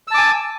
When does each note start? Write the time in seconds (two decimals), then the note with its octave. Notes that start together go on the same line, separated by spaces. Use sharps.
0.08 E6
0.11 A5
0.14 D6
0.17 G#5